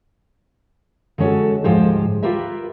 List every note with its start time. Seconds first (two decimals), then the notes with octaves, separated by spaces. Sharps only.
1.18 D3 G#3 C#4 F#4 A4
1.64 D2 G#2 F3 G#3 G4 C5
2.23 F4 G4 A#4 B4 E5